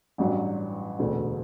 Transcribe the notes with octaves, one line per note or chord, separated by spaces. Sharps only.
A1 G2 F#3
E1 D2 D3